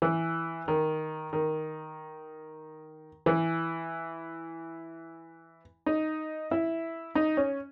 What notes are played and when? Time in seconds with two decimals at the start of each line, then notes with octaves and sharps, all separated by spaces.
0.02 E3
0.68 D#3
1.33 D#3
3.26 E3
5.86 D#4
6.51 E4
7.15 D#4
7.37 C#4